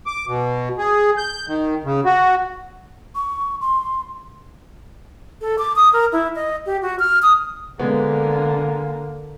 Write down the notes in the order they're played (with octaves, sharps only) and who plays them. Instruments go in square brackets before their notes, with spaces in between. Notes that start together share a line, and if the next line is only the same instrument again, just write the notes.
[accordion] D6
B2
G#4
G6
D#3
C#3
F#4
[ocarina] C#6
C6
[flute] A4
D6
D#6
A#4
E4
D#5
G4
F#4
F6
D#6
[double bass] D3 A#3 [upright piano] G#3 B3